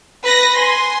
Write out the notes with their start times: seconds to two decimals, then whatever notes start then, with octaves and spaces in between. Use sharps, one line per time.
0.23 B4 A#6
0.56 G#5 C6